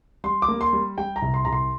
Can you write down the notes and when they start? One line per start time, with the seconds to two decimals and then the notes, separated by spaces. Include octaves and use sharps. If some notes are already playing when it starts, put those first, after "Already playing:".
0.24 G3 C6
0.42 D6
0.48 A#3
0.61 C6
0.73 G3
0.98 G3 G5
1.16 A#5
1.22 C2
1.34 C6
1.45 C2 A#5
1.52 C6